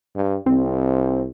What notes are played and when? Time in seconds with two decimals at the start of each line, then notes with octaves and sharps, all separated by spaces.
0.16 G2
0.46 C2 C4